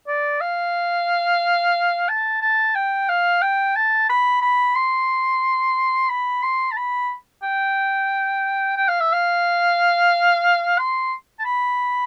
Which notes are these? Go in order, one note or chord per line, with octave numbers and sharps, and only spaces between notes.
D5
F5
A5
A5
G5
F5
G5
A5
B5
B5
C6
B5
C6
A5
B5
G5
G5
F5
E5
F5
C6
A5
B5